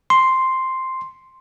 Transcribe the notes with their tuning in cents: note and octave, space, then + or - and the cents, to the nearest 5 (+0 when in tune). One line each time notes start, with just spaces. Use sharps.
C6 +0